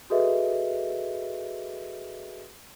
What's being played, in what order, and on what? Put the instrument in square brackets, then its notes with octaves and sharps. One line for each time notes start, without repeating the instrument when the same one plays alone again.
[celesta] F#4 G#4 A4 B4 D#5 E5